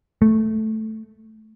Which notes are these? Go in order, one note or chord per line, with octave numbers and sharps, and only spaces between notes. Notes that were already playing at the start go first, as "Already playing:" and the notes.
A3